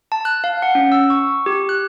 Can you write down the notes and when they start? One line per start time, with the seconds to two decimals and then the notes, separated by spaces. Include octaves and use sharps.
0.12 A5
0.25 F#6
0.44 F5
0.62 F#5
0.75 C#4
0.92 E6
1.10 C#6
1.46 G4
1.69 F#6